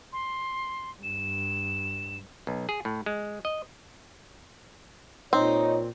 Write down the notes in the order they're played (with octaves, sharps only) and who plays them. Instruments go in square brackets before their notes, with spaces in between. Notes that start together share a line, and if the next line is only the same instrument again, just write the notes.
[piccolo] C6
[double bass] G2 [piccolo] E7
[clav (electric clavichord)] B1
G#4
A2
G#3
D#5
[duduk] A#2 [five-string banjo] C4 [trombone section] D#4 [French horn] C#5